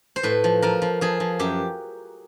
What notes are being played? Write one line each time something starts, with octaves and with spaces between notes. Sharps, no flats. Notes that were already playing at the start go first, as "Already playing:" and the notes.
C5
A2 B4
F3
F3 A#4
F3
F3 G#4
F3
F#2 G4